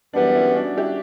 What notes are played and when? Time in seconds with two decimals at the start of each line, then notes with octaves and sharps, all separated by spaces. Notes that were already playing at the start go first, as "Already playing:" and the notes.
0.13 F#2 E3 G3 B3 D4
0.35 C#4 E4
0.56 D4 F#4
0.77 E4 G4